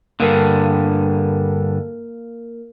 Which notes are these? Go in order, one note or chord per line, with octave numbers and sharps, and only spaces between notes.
G2 D3 A#3 A#4